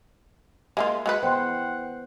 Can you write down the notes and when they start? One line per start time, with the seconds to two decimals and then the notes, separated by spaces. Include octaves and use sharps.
0.77 G#3 A#3 F4 E5
1.06 G#3 F#4 B4 F#5
1.23 E3 B3 C5 F#5 G5 C6